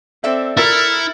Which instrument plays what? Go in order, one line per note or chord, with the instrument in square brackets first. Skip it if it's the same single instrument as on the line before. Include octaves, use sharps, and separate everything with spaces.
[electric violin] C4 [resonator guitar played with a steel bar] A4 D5 E5
[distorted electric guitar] E4 [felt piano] A#4 E6 A6 [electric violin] F6 C#7